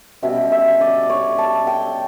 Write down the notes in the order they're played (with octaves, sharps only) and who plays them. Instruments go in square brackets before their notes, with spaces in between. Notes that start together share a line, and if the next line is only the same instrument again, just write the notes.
[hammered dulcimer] B2 G3 C#4 E5
E5
D5
C#5
A5
G5